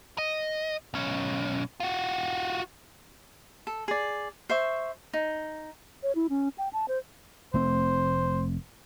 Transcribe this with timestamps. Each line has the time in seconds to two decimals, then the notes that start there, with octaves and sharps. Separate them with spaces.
0.18 D#5
0.94 B1 C#4
1.80 F4 F#4
3.67 A4
3.88 G#4 D5
4.50 C5 E5 C#6
5.13 D#4
6.03 C#5
6.15 E4
6.30 C#4
6.58 G5
6.73 A5
6.88 C5
7.54 F1 A3 C4 C5